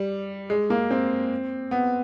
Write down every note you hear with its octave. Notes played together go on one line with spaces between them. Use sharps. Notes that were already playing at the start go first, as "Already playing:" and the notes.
Already playing: G3
G#3
A#3
C4
B3